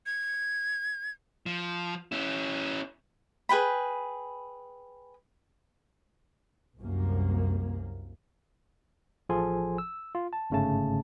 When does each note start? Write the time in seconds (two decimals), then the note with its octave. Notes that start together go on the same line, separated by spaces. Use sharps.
0.06 G#6
1.46 F3
2.12 C#4 E4
3.49 G#4 B4 G5 B5
6.79 C2 F#2 A#3
9.29 A1 F3 G#4 A4 G#5 C6
9.78 E6
10.15 F4
10.33 A5
10.50 G1 G#2 C#3 A3 C#4 A5